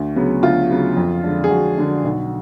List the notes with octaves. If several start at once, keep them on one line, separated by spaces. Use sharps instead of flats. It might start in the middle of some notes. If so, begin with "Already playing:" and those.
Already playing: D2
C#3 F#3 B3
D2 F4
C#3 F#3 B3
F2
D3 G#3 D4
G#4
F2 F#4
D3 G#3 D4
B1